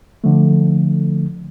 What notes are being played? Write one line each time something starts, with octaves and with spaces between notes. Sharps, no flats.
D3 F3 A3